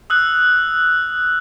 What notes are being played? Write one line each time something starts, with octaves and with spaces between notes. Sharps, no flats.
D#6 E6 F#6